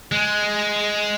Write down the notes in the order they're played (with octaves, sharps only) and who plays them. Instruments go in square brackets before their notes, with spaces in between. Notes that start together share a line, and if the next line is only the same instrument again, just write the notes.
[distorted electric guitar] G#3